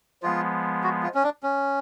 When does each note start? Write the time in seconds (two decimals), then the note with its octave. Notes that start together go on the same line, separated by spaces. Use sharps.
0.22 F3 G#3 B3 F4
0.83 F#4
1.03 F4
1.15 C#4
1.24 D4
1.43 C#4